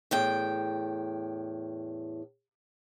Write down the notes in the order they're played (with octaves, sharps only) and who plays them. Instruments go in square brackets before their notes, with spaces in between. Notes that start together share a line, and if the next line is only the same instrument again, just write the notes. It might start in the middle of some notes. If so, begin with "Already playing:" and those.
[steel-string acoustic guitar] E2 A2 G5